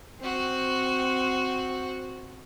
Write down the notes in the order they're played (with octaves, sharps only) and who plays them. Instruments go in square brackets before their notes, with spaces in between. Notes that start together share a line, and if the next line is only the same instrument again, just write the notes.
[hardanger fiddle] C4 F#4